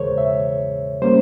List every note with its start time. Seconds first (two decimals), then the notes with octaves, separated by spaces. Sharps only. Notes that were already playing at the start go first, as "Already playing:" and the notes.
Already playing: E2 C#3 E3 G#3 G#4 A#4 C5 C#5
0.18 E5
1.02 G3 A#3 C#4 C5